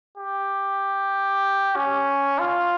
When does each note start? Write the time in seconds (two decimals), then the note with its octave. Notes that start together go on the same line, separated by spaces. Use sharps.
0.17 G4
1.76 C#4
2.39 F4